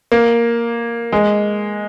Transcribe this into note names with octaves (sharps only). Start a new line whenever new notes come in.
A#3
G#3